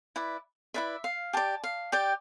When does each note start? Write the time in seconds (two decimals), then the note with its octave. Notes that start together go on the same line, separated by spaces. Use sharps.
0.16 E4 B4 D5
0.74 E4 B4 D5 E5
1.04 F5
1.33 G4 D5 A5
1.64 F5
1.92 G4 D5 G5